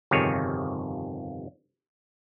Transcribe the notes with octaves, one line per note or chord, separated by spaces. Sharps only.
G1 F2 C3 D#3 G#4 C#5